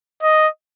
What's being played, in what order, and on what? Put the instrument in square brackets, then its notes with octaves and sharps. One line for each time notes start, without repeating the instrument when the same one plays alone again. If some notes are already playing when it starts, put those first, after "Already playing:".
[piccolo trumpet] D#5